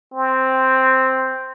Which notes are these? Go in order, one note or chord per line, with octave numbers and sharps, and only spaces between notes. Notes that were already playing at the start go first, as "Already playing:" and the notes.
C4